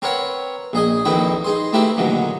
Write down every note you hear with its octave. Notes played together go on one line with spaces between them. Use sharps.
C4 A#4 B4 C#5 F#5
A#1 G#4 D#5 G#5
A#1 F2 D#3 E4 B4 G5
D#4 G#4 C6
A3 C4 E4 G4 A#4 B4
F#2 A#2 D3 D#3